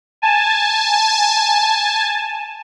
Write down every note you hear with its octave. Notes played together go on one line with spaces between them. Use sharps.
G#5 A5